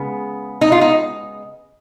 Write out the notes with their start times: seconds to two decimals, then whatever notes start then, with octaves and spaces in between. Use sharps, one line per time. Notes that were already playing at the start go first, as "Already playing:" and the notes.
Already playing: C#3 G#3 B3
0.61 D#4
0.72 F4
0.81 D#4